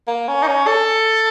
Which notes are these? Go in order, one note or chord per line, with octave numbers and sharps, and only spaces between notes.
A#3
C#4
D#4
C#4
A4